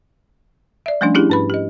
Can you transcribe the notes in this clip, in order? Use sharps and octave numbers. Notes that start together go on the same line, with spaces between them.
D5 E5
F3 G3 A3 C#4 D4
C#4 D4 E4 G4 G#4
G#2 B4 B5
G4 D#5